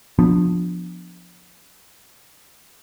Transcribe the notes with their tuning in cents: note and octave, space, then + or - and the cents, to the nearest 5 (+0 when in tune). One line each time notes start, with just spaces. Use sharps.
F3 +15 B3 +0 D4 -5